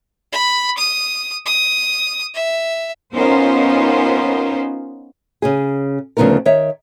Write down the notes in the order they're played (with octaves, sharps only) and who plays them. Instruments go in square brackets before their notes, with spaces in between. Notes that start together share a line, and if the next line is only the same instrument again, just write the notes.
[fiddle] B5
D#6
D#6
E5
[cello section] B3 C#4 D#4 F4 A#4 C5
[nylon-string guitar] C#3 C#4 G#4
D2 C#3 F3 B3 D#4 A#4
D#3 C#5 E5